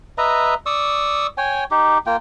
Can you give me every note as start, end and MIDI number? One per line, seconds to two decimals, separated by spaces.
0.18 0.54 71
0.18 0.54 75
0.18 0.54 76
0.18 0.54 82
0.66 1.27 74
0.66 1.27 85
0.66 1.27 87
0.66 1.27 88
1.38 1.64 73
1.38 1.64 79
1.38 1.64 80
1.71 1.98 63
1.71 1.98 67
2.06 2.16 58
2.06 2.16 65
2.06 2.16 79